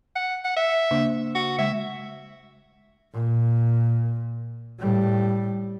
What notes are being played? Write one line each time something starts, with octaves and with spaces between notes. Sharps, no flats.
F#5
F#5
E5
C#3 A#3 D4
F#4
C#3 G#3 E5
A#2
A2 G3